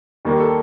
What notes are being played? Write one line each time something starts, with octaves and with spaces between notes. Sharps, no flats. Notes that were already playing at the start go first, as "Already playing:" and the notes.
D#2 D#3 G3 A#3
A4